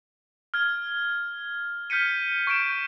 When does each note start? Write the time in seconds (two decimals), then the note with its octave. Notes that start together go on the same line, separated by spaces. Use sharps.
0.54 F6 G#6
1.90 F6 G6 B6 C#7 D#7
2.47 C#6 G6 D7 E7